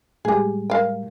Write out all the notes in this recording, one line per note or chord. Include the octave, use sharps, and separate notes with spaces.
A2 G3 G#3 G4 G#4
A#4 F5 G5